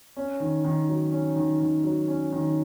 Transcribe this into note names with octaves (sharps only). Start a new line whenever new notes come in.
C#4
D#3
D#3
F#3
C#4
D#3
D#3
F#3
C#4
D#3